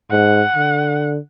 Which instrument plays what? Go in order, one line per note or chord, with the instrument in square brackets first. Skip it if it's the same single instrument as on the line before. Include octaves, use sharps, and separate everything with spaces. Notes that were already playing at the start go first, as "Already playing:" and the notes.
[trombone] G#2 [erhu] F#5
[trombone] D3